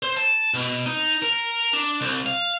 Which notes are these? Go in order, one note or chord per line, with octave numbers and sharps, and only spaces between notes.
C5
A5
B2
D#4
A#4
D4
C2
F5